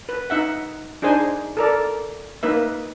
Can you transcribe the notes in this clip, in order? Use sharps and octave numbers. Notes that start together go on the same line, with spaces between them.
B4
D#4 E5 F#5
D4 D#4 G#4 C5 G#5
A4 A#4 D5
A#3 D#4 B4 E5